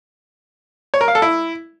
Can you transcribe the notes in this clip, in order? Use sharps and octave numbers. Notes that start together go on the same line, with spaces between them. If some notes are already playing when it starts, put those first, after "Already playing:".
C#5
A#4
F5
A4
E4